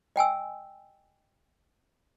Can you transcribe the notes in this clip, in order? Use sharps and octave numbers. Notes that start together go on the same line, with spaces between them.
D#5 G5 G#5 E6